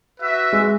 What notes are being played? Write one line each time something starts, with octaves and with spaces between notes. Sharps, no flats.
F#4 B4 E5
G#3